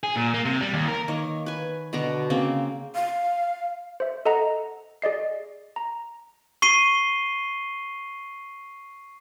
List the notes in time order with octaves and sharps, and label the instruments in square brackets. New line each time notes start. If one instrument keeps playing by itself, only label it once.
[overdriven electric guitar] G#4
A#2
A#3
C3
G3
D#2
A#4
[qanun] D#3 A#3 C#5
B4 G#5
B2 D3 F#4 A#5
C#3 A#3 C4
[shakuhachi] F5
[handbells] C5 E5
A4 D#5 F#5 A#5
G#4 D5 D#5 C7
A#5
[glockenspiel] C#6 C7 D#7 G7